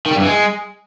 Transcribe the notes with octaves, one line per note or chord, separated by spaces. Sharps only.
D#3
G3
G2
E3
G#3